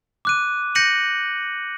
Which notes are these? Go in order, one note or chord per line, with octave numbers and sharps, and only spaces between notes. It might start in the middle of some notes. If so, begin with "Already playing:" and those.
D6 F#6 D#7
G6 A#6 C#7 D#7 F#7